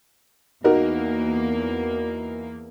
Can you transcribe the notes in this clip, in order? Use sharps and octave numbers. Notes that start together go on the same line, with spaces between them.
E2 A#3 D#4 F#4 A#4